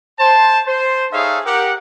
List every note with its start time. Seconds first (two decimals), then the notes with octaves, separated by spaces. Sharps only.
0.19 C5 A5
0.67 C5
1.13 D#4 G#4 A4 C#5 E5 F5
1.46 G4 A#4 F#5